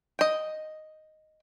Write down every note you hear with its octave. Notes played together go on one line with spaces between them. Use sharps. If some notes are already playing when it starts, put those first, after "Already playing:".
D#5 G5